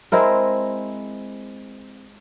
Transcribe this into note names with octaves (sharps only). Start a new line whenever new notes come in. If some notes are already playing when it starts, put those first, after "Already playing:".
G#3 C4 E4 A#4